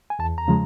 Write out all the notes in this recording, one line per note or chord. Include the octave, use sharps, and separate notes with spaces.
G#5
E2 A5
A#5
C#3 F3 G#3